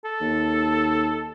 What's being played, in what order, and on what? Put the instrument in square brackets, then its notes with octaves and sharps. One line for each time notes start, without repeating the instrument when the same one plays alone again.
[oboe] A4
[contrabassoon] D#2